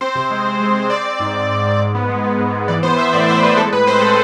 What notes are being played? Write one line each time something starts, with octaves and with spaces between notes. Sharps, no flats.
C4 C5
C3
G#3
C4
G#3
C4
C4 D5
C4
G#2
G#2
G#2
G#2
G#2
B3
G#3
B3
G#2
G#2
E3 D5
B3 C5
B3 E5
A2 D5
A2 C5
A2 B4
G#3 A4
A2 B4
C4 C5
G#3 A4